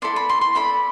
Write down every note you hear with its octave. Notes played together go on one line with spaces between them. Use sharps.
E4 A4 D5 C6
B5
C6
C6
E4 A4 D5 B5